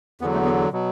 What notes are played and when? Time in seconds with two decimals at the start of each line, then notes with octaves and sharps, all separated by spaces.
0.21 E2 D3 F#3 B3
0.34 A3
0.45 B3
0.72 B2 F#3